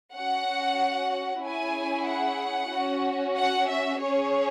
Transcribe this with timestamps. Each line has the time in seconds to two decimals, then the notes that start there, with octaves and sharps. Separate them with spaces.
0.14 C#4 F#4 F#5
1.44 C#4 E4 G#4 G#5
2.07 F#5
2.72 C#4 F#4
3.37 F#5
3.69 E5
4.01 C#4 G#4 C#5